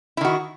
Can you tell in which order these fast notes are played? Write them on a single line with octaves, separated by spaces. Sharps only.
E4 D#3 F#4